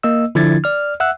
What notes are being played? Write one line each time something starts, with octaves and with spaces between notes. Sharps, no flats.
A#3 D#5 E6
D3 F3 D4 E4 G#6 A6
D5 F6
E5 F#5 E6 F#6